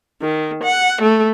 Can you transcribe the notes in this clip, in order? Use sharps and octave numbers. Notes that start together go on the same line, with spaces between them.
D#3
F#5
A3